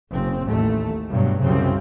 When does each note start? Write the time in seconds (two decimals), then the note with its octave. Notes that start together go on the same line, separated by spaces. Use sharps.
0.11 F#1 C4
0.46 A1 D#2 A3
1.10 G2 B2 F#3
1.42 C2 F#2 C#3 C4